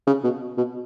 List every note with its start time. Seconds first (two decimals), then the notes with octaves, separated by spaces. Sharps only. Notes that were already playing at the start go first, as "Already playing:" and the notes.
0.07 C#3
0.24 B2
0.57 B2